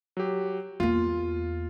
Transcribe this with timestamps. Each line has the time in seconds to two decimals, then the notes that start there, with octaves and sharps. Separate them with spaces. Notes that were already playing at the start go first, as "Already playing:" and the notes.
0.17 F#3 G4
0.80 E2 A#3 F4